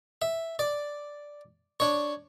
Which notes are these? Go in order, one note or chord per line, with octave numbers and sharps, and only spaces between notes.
E5
D5
D4 C#5